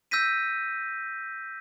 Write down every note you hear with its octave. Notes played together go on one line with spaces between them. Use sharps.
E6 G6 A#6 B6 D#7